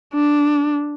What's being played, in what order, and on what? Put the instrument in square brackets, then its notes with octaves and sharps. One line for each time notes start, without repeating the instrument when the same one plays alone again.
[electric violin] D4